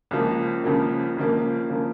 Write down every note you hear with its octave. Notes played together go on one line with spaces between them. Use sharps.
C#2 C#3 F3 A#3
C#2 C#3 F3 A#3
C#2 C#3 F3 A#3
C#3 F3 A#3